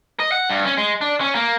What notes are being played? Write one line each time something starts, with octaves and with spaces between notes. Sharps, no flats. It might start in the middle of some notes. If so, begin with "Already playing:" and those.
D#5
F#5
G2
C#4
G#3
D4
C#4
A#3